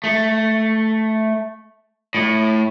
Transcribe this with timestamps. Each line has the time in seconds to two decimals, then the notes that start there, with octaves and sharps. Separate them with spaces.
0.04 A3
2.15 A2